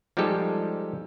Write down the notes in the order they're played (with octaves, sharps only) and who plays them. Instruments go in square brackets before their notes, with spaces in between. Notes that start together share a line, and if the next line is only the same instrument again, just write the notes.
[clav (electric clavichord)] F3 G3 G#3 D#4 G4 A4